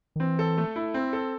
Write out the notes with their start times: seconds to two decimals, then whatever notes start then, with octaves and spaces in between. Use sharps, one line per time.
0.16 D#3
0.20 E3 C4
0.39 A4
0.57 A3
0.76 E4
0.94 C4
1.13 A4